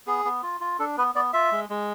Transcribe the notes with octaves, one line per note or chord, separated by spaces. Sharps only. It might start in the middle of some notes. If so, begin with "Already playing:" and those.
B3 G#4
B3
F4
F4
D4 A4
B3 B4
B3 D5
F4 E5
G#3
G#3